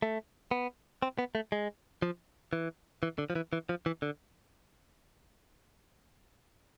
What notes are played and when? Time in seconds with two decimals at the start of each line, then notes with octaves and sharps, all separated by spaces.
0.02 A3
0.51 B3
1.02 C4
1.19 B3
1.35 A3
1.52 G#3
2.02 F3
2.53 E3
3.03 E3
3.18 D3
3.30 F3
3.35 E3
3.53 E3
3.69 F3
3.86 E3
4.02 D3